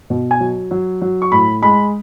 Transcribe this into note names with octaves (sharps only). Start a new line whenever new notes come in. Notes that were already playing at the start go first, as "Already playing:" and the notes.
B2
G#5
F#3
F#3
F#3
C#6
A2 B5
G#3 B5